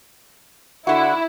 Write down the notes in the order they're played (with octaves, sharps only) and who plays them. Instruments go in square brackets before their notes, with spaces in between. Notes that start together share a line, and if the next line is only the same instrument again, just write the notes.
[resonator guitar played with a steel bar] D3 F#4 [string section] E4